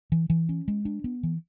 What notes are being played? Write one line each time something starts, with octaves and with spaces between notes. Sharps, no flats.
E3
E3
C#4
G#3
D4
B3
E3